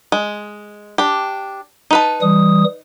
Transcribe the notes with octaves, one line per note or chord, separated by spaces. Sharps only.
G#3
D4 G4
D#4 B4 A5
E3 G3 D#6